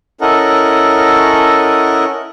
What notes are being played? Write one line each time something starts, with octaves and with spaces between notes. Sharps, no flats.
C#4 E4 A4 A#4 D#5 F#5